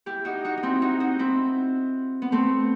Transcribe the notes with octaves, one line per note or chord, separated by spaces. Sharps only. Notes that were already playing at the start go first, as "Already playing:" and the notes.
E4 G4
D#4 F#4
D#4 F#4
D#4
C4 E4
D#4 F#4
D#4 F#4
C4 E4
B3
A3 C4